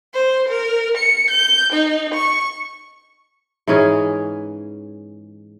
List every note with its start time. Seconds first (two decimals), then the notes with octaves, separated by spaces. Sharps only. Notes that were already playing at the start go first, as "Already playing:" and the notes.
0.14 C5
0.48 A#4
0.97 C#7
1.31 G6
1.73 D#4
2.14 C#6
3.67 G#2 E3 C#4 G#4